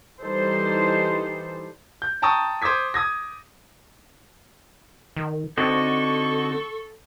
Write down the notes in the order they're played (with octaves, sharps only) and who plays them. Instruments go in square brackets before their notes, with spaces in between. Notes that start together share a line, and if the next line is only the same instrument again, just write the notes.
[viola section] E3 G3 D#4 A4 C5
[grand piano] G6
G5 A5 A#5 C#6 D#6
C5 D6 D#6 G#6 B6
D#6 G#6 A#6
[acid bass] D#3
[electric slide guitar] D3 D#4 F#4 [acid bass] C4 [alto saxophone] A4 [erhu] C#6